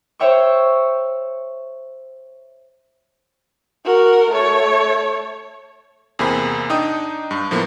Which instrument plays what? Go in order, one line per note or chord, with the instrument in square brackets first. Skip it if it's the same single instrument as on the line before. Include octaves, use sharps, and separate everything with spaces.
[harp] C5 C#5 E5 G5 C#6
[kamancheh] F#4 A#4
A3 C#5
[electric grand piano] E2 C3 A#3 G#4 C5 B5
D4 D#4 G5 D#6
G2
A2 F3 A#3 B3